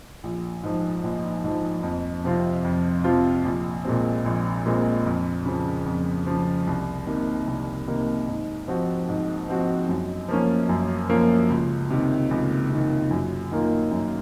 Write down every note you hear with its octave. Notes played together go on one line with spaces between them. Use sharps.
A#1
G#2 F3
A#1
G#2 F3
F2
C3 F3 C4 F4
F2
C3 F3 C4 F4
A#1
A#2 G#3 C4
A#1
A#2 G#3 C4
F2
C#3 F3
F2
C#3 F3
C2
C3 D#3 A#3
C2
C3 D#3 A#3
G#2
F3 C4 F#4
G#2
F3 C4 F#4
F#2
F3 A#3 C#4
F#2
F3 A#3 C#4
C#2
C3 D#3
C#2
C3 D#3
F#2
D#3 A#3 F4
F#2